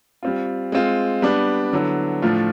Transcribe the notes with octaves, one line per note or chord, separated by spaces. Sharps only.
G3 C4 F4
G#3 C4 F4
G3 B3 D4
D3 F#3 B3 E4 A4
A2 F3 A3 D4 F4